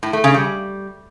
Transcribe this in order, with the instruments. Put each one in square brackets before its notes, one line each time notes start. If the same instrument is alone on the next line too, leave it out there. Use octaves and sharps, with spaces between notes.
[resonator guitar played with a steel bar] A2
A3
C#3
G3